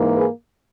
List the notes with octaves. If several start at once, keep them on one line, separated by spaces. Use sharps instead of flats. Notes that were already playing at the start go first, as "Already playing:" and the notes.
Already playing: G#2 E3 A#3
G#4 B4